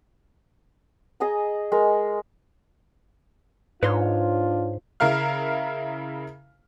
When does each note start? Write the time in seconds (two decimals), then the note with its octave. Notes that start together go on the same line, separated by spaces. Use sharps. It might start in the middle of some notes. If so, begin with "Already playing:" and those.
1.20 G#4 D#5 G#5 A#5
1.72 G#3 A#4
3.83 G#2 D4 F4 B4 C#5 C6
5.00 C#3 E4 A#4 F5 F6